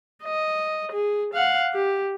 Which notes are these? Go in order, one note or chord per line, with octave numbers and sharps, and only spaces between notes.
D#5
G#4
F5 F#5
G4